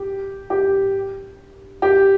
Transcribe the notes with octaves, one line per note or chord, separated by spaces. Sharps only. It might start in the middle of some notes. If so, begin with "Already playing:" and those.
Already playing: G4
G4
G4